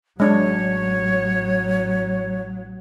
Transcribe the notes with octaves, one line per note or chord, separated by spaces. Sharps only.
A1 F#3 G#3 D4 C#5